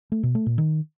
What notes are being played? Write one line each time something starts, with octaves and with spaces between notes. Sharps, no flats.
A3
B2
A3
A#2
D#3